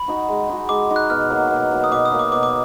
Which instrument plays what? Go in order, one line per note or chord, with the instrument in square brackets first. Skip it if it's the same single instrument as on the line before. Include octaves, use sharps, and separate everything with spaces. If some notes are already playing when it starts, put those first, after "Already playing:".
Already playing: [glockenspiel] B5
[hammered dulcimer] D#4 F#4
G#3
D#4 F#4
[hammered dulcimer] G#3 [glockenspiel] D6
[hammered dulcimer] D#4 F#4
[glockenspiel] F#6
[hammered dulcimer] B2 [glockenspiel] F6
[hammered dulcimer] F#3 A#3
B2
F#3 A#3
[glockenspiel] D#6
[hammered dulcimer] B2 [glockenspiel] D6
[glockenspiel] D#6
[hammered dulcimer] F#3 A#3
[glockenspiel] D6
[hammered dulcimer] B2 [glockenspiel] D6
[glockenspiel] D6